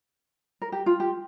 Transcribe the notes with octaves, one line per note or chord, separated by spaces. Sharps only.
A#4
G4
F4
G4